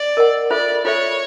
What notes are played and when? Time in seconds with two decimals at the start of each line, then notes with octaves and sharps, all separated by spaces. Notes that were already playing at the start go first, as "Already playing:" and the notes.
Already playing: D5
0.17 A#4 D#5 F#5
0.51 F4 A4 C5 D5 E5
0.85 F4 A4 C5 C#5 E5